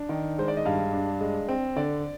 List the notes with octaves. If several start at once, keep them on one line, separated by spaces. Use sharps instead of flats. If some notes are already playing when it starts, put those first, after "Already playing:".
Already playing: D4
D#3
G#3 C5
D5
D#5
G2 F5
D4
G#3
C4
D3 D5